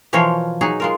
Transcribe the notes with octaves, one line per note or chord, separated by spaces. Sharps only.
B2 E3 F3 A#4 C5 C#5
F#3 D#4 G#4
G#3 F4 A#4